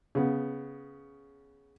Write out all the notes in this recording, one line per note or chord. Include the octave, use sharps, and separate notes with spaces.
C#3 B3